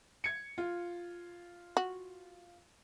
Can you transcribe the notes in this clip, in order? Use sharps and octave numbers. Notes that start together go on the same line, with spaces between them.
G#6 C#7
F4
F#4